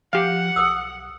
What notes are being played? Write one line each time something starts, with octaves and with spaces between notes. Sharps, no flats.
F3 G4 F5 F#5
B1 A4 D#6 E6